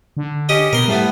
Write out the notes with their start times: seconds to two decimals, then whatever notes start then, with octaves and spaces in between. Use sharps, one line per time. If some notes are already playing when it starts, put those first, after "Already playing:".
0.17 D3
0.49 C#4 G4 D#5
0.73 B2 A#4 C6
0.88 A2 G3 A3 B3